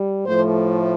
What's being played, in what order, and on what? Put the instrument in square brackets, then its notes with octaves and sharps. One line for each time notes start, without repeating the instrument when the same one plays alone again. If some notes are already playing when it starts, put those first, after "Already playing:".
Already playing: [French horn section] G3
A2 F3 A3 C5